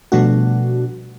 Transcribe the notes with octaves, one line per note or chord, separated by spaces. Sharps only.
B2 F3 G3 A3 D4 F#4